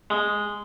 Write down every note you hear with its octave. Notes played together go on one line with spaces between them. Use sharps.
G#3